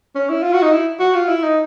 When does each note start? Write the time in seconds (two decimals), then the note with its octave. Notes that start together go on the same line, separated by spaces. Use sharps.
0.15 C#4
0.30 E4
0.43 F4
0.54 F#4
0.62 D#4
0.72 E4
1.00 F#4
1.15 F4
1.29 E4
1.43 D#4